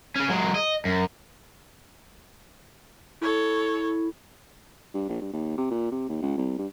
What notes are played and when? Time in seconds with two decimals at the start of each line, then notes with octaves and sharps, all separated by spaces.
0.16 C#3 C#4
0.30 F#3 G#3
0.55 D#5
0.85 F#2
3.21 E4 A4 C#5
4.94 G2
5.09 A#1
5.21 G2
5.33 D#2
5.57 C3
5.71 A#2
5.91 C3
6.09 D#2
6.22 C#2
6.37 C2
6.58 G2